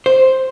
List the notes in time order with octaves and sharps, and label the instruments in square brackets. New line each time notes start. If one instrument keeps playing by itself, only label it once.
[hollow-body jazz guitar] C5